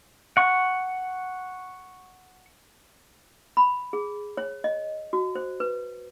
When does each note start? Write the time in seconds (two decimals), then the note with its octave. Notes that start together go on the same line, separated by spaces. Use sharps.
0.37 F#5 C#6
3.57 B5
3.93 G#4
4.37 C#5
4.64 D#5
5.13 F#4
5.35 C5
5.60 B4